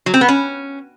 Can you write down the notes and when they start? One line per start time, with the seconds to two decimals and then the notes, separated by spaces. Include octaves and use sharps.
0.06 F#3
0.14 C4
0.21 B3
0.28 C#4